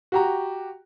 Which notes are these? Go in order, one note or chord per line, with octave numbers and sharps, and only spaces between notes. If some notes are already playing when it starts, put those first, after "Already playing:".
F#4 G4 A#5